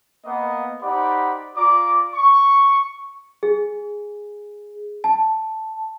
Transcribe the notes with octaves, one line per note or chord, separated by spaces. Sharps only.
A#3 B3 D#5
D#4 G4 C5 D5 F#5 B5
F4 D5 A#5 D6
C#6
G#4
A5